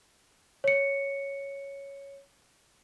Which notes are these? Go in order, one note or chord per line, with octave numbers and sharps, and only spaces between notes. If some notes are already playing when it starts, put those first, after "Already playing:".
C#5 C#7